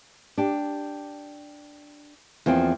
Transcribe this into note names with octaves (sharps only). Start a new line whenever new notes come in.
D4 G4
E2 F3 A#3 C4